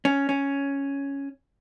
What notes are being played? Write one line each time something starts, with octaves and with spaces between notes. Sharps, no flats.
C#4
C#4